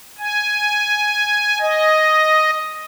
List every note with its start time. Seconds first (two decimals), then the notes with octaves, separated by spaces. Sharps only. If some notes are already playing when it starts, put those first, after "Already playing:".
0.19 G#5
1.61 D#5